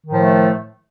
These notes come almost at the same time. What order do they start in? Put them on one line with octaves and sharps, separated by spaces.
D#3 A2 F3 A3